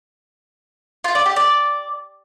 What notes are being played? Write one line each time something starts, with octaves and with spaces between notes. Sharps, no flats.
F4
D5
G4
D5